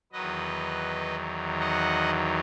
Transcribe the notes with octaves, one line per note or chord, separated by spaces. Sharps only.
E2 D#3 F#3 B4 D#5
D#5 F#5